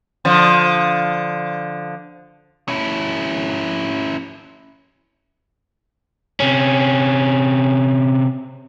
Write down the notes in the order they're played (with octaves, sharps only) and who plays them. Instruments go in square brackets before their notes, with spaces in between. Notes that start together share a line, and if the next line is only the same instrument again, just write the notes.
[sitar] D3 F3
[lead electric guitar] C#4 E4
[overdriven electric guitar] C3 C#4